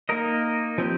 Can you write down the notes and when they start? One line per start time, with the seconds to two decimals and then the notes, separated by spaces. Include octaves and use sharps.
0.09 A#3 D#4 A#4 D#5
0.78 F3 C4 G4